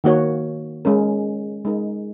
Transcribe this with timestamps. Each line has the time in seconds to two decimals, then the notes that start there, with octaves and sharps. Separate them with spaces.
0.04 D#3 A#3 F#4 C#5
0.85 G#3 C#4 A#4
1.65 G#3 D#4 A#4